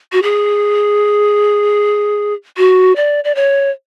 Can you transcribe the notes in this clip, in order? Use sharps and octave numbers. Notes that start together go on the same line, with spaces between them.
F#4
G#4
F#4
D5
D5
C#5